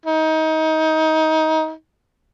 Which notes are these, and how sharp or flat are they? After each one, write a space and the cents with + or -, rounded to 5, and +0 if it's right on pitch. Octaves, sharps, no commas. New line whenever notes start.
D#4 +25